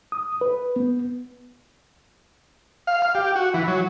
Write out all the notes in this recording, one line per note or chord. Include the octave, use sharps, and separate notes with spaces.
D#6
B4
B3
F5
F5
G4
F#4
E3
F#3